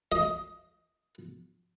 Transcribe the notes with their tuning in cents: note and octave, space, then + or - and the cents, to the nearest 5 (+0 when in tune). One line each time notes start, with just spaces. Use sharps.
D#5 +15